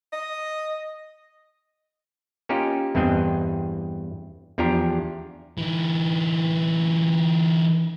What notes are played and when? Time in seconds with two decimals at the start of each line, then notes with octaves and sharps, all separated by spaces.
0.12 D#5
2.49 A#3 C#4 D#4 F4 G4
2.95 E2 G2 C4 D4 D#5
4.58 E2 F3 D4 G4 A#5
5.58 E3 D#4